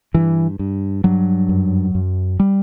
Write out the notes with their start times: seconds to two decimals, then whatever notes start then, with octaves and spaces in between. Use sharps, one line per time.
0.14 G2 E3
0.59 G2
1.04 G2 F#3
1.49 F#2
1.95 F#2
2.40 G3